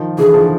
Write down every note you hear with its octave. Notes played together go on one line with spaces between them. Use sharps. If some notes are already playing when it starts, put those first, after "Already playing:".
Already playing: D#3 F3
D3 E3 G#4
D#3 F3